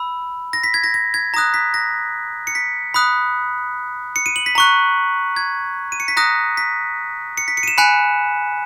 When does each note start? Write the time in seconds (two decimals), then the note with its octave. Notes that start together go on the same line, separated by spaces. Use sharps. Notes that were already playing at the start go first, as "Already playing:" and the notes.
Already playing: B5 E6
0.53 A#6
0.64 B6
0.74 G#6
0.84 A#6
0.94 A#6
1.14 G#6
1.34 A#5 D#6 F#6 A#6
1.54 B6
1.74 A#6
2.47 C#7
2.55 B6
2.94 B5 D#6 F#6
4.16 C#7
4.26 D#7
4.36 F#7
4.46 B6
4.55 A#5 C#6 F#6
5.36 G#6
5.92 D#7
6.00 C#7
6.08 B6
6.17 A#5 D#6 F#6 A#6
6.57 B6
7.37 C#7
7.48 B6
7.57 C#7
7.63 D#7
7.68 E7
7.78 G#5 B5 F#6 C#7